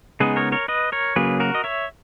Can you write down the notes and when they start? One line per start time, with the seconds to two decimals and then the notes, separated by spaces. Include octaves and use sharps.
0.20 C#3 G#3 B3 D#4 G#4 B4
0.36 A#4 C#5
0.52 A#4 C#5
0.68 B4 D#5
0.92 A#4 C#5
1.16 C#3 F#3 A#3 G#4 B4
1.40 F#4 A#4
1.55 D#5
1.64 C#5 E5